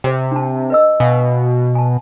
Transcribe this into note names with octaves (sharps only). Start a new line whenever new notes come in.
C3 C5 G5
D4 A5
B4 D#5 E6
B2 F5 G#5
G#5 A5